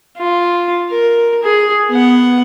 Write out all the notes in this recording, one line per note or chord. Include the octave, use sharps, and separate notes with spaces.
F4
A#4
G#4
B3 F#5